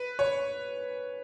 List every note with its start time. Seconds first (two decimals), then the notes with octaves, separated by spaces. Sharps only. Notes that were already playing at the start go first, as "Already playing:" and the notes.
Already playing: B4
0.19 C#5